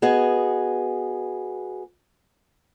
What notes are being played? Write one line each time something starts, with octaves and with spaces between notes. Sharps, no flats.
B3 F#4 G#4 D#5